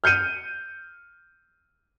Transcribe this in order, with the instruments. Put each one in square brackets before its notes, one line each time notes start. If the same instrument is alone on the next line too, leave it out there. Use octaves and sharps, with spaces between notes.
[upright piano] F6 G6 C#7 D#7